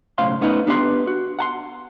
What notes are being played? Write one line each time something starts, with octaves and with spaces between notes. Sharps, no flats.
B1 A2 C#3 C5 F5 C6
A3 B3 C#4 D#4 B4
B3 D4 G4 B4 F5 C6
F#4
F#5 A5 C6